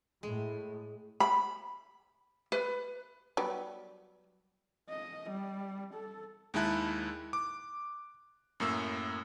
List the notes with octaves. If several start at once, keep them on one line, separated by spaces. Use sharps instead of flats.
A2 G#3
B5
B4
F#3 G3 B3
D#5
G3
A4
D#2 G#3 D#4 E4 A5 F#6
D6
F#2 A2 A#3 E6